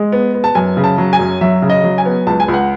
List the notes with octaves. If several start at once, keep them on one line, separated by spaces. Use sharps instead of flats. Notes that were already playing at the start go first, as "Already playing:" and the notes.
Already playing: G#3
B3
B3
A5
F#2 G#5
C#3
A5
F#3
G#5
F#2
F#3 E5
C#3
D#5
F#3
G#5
B3
C#2 A5
G#5
C#2
F#5